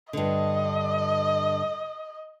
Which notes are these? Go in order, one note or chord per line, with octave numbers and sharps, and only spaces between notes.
G2 D3 D#5